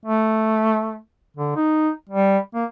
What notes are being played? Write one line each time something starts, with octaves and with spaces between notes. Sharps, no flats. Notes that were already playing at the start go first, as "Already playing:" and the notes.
A3
D3
D#4
G3
A#3